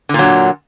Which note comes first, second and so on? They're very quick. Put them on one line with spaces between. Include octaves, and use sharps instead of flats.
D3 A#2 F#3